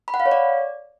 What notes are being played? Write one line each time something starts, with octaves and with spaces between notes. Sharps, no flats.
B5
F#5
F5
C#5
D5